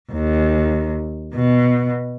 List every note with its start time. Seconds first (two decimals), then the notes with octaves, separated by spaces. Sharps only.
0.12 D#2
1.35 B2